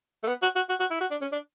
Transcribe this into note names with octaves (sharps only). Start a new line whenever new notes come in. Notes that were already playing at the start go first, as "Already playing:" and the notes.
A3
B3
F#4
F#4
F#4
F#4
E4
F#4
D4
C#4
D4